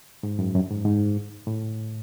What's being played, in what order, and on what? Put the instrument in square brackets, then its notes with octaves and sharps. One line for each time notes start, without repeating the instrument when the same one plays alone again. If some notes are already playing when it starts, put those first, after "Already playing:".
[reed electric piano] G#2
F#2
F#2
G#2
G#2
A2